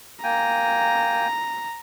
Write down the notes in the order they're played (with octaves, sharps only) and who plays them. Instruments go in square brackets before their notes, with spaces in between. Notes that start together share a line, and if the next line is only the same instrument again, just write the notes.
[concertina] A#3 G5 G#5 [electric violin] A#5